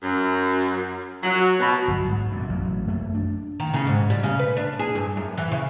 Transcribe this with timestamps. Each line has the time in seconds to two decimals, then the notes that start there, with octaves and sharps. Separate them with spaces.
0.03 F#2
1.22 F#3
1.60 B2
1.88 G1 F#3
2.05 G#2
2.32 F#2 A#2
2.49 A1 F#3
2.87 F#2 A3 A#3
3.14 D4
3.60 D#3
3.74 C#3
3.87 G#2
4.10 G3
4.23 C#3
4.39 B4
4.57 D4
4.79 G#4
4.95 G2
5.17 F#2
5.37 E3
5.52 C#3